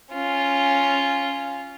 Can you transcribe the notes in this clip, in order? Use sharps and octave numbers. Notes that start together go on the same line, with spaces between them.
C#4 F4